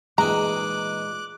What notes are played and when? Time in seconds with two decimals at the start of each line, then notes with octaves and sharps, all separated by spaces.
0.18 A#2 E3 G#3 D#4 A#5 D6 F#6